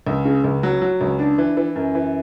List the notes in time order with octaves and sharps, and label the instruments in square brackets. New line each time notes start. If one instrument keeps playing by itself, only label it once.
[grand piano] C#2
C#3
C#2
F#3
F#3
C#2
D4
E3
E3
F#2
E3